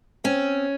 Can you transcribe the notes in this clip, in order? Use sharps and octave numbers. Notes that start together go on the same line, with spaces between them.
C4 C#4